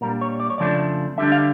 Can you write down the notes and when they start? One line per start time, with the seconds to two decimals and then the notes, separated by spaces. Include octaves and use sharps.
0.01 A#2 G3 D4 A#4
0.21 C#5
0.40 D5
0.50 C#5
0.58 F2 C#3 F3 A3 D4 D5
1.18 D3 G3 D4 E5
1.32 F5